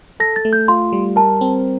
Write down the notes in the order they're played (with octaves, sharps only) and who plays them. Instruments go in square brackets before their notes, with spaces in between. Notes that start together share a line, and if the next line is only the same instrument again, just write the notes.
[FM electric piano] A4 [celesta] A#6
[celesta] A6
[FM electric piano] A3
[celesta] G6
[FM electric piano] F4 [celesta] C6
[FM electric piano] G3
[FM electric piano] A#4 [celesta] A5
[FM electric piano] C4